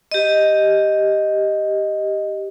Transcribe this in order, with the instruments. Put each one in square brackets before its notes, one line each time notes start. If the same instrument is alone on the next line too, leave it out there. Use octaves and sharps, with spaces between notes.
[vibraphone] G4 D#5